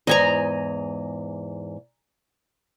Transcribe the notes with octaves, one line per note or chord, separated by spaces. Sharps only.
E2 G#2 D#5 G#5 A#5